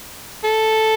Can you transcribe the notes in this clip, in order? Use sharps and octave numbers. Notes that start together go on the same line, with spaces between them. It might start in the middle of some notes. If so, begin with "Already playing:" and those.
A4